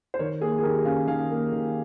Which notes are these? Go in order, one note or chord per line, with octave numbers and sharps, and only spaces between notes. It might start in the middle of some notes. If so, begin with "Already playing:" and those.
C5
D#3 A#4 C#5
A#3 G#4
G#4
D#3 G4 A#4
C#4 F5 G#5
D#3 F5 G#5
A#3
D#3